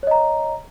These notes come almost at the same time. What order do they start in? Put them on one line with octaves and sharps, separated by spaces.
C#5 D#5 A#5